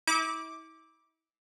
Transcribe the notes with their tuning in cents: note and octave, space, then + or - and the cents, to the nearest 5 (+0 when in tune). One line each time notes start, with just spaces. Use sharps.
E4 -40 D6 +0